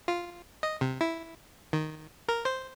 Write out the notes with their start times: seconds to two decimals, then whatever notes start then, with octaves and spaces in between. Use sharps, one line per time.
0.08 F4
0.63 D#5
0.81 C3
1.01 E4
1.73 D#3
2.29 A#4
2.45 C5